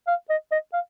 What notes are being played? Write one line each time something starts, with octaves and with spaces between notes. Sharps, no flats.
F5
D#5
D#5
F5